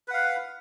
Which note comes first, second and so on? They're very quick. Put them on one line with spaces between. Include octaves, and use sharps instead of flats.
B4 F#5 F5